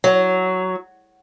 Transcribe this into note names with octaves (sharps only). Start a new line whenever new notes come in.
F#3